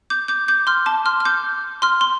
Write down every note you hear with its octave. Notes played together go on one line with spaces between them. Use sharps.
D6 G6
D6 G6
D6 G6
C6 F6
A5 D6
C6 F6
F6
D6 G6
C6 F6
C6